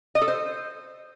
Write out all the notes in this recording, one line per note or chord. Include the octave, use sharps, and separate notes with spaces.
D#5
A4
C5